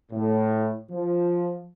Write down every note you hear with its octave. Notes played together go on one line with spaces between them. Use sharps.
A2
F3